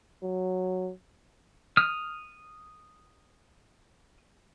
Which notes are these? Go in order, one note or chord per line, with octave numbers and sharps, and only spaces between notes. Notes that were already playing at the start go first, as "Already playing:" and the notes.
F#3
D#6 F6